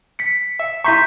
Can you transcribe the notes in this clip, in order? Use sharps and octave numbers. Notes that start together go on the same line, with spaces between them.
B6 C#7
E5
E4 A#5 C6 C#6 G6 B6